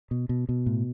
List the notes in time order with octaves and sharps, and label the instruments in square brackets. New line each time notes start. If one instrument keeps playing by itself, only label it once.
[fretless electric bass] B2
B2
B2
A2